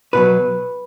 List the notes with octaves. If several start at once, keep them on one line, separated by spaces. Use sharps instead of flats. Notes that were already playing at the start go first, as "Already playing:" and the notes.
B2 F#3 B4